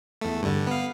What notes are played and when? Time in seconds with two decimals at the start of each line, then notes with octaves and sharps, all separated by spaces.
0.21 E2 A3
0.43 G2 D3
0.67 B3 F5